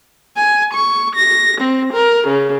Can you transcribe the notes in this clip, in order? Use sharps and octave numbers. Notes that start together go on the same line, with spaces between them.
G#5
C#6
A#6
C4
A#4
C#3